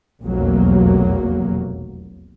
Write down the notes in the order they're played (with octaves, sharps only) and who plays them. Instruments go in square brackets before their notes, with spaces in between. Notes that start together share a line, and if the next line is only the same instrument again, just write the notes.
[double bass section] F1 B1 E2 F#3 A#3